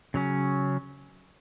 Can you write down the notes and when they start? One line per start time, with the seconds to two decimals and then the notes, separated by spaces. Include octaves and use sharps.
0.14 C#3 F#3 C#4